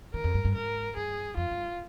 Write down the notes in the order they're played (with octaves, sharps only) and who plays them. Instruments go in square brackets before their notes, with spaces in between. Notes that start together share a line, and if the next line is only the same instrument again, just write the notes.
[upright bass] D#3 [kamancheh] A#4
[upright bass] F2
G2
G2
[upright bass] G#2 [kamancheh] A#4
[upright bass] G2 [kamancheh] G#4
[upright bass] F2 [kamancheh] F4
[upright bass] G2